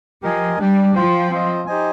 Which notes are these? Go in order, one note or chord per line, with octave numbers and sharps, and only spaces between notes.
F3 G4 A#4 D#5 G#5
G3 D4 G4 D5 G5
F3 F4 C5 G5
C4 F4 C5 D#5
D#4 G4 C5 D#5 G#5